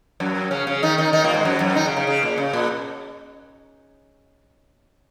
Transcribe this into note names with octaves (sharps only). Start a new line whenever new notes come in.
F#2 F#3
C#3 C#4
C#3 C#4
D#3 D#4
D#3 D#4
D#3 D#4
A#2 A#3
G#2 G#3
F#2 F#3
F#2 F#3
D#3 D#4
C#3
C#3
C#3
A#2
C#3
A#2